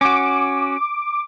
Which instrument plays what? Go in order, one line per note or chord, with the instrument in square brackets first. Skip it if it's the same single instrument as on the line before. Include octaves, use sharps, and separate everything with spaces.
[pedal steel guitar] C#4 F#4 [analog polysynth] D6